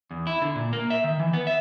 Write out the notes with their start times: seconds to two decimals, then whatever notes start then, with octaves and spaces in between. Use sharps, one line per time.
0.11 E2
0.27 E4
0.42 D3
0.55 A#2
0.73 A#3
0.90 E5
1.04 D#3
1.19 E3
1.33 B3
1.47 E5